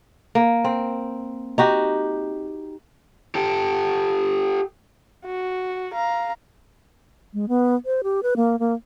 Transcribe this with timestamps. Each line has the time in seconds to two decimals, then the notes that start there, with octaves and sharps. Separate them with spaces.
0.35 A#3
0.65 C4
1.58 D#4 F#4 G4
3.35 G4 A4
5.25 F#4
5.94 F5 A#5
7.34 G#3
7.49 B3
7.86 C5
8.04 G4
8.23 B4
8.36 A#3
8.59 A#3